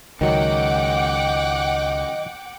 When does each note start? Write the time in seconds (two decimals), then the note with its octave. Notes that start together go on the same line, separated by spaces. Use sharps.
0.21 C#2 D#3 F#3 D#5 F#5 G5 D6